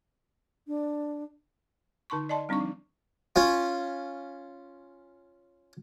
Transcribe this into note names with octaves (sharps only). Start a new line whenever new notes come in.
D4
D3 D#4 A5 C6 C#6
D5 D#5 A5 C6
G3 C4 D4 D#4 C#6
F3
C#4 F4